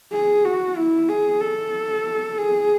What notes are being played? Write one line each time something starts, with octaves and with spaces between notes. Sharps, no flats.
G#4
F#4
E4
G#4
A4
G#4